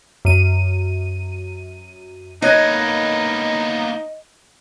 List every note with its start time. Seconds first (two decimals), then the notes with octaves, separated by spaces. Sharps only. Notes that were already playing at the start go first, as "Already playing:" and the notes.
0.25 F#2 D#7
2.42 A#3 B3 D#4 C#5 D#5 F#6 G#6